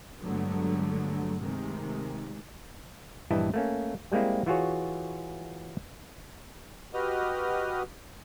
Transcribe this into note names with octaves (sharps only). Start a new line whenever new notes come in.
G2 D3 F#3 G#3 A3 B3
C3 D#3 G#3 A3
A#1 G2 E3 E4 D#5 A5
A3 A#3 C#4
G3 G#3 A#3 C4 E4
E3 F4 F#4 G#4 C#5
F#4 G4 B4 D#5 D#6 F6